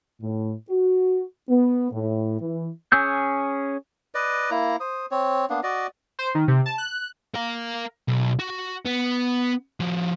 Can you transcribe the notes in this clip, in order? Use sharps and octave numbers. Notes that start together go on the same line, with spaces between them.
A2
F#4
B3
A2
E3
C#4 G#4 E6 G6
B4 D5 D#5
A#3 E4 A#5
C5 D#6
C4 C#5
A#3 B3 D4
F#4 D5 D#5
C5
D#3
C3
A5
F#6
A#4 F5
B1
F#4
B3
F3 F#4